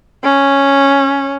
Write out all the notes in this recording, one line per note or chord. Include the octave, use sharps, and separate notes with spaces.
C#4